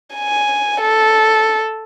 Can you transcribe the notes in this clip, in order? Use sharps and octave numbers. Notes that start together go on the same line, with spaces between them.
G#5
A4